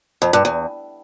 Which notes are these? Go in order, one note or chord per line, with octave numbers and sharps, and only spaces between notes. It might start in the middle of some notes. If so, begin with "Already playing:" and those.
F2
G2
E2